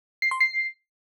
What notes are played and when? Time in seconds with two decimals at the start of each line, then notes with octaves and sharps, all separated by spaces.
0.22 C7
0.31 C6
0.40 C7